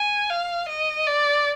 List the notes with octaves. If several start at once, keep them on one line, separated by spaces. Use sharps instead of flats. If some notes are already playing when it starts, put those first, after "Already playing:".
Already playing: G#5
F5
D#5
D5